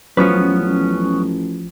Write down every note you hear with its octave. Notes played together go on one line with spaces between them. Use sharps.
A1 F3 F#3 B3 C#4 B4